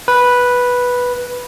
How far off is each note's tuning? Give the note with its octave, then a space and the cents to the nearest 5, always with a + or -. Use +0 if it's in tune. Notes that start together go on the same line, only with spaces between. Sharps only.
B4 -5